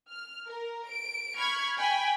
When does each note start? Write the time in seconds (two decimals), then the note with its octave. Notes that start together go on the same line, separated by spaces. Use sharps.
0.11 F6
0.47 A#4
0.87 D7
1.38 B5 C#6 F6 G#6
1.77 G5 G#5 B5